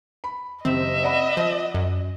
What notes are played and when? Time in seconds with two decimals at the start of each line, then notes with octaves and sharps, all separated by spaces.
0.24 B5
0.65 F#1 C4 G4 D#5 E5
1.03 D5 F#5 B5
1.37 F3
1.74 F#2